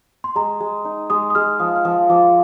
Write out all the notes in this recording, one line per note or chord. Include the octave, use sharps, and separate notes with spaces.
C6
G#3 A#5
G#3
D#4
G#3 D#6
D#6
G#3 F6
F3 D#6
F6
F3 D#6
F3 D6